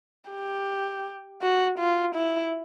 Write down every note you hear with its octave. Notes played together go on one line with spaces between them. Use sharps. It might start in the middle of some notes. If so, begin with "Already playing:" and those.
G4
F#4
F4
E4